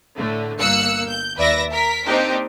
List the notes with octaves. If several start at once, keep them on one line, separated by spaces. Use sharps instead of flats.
A2 D3 A3
G1 A#3 F5 E6 F#6 C#7
G6
D#2 B4 D5 E5 A#6
A#4 B6
A#3 C4 D4 D#4 G4 A#4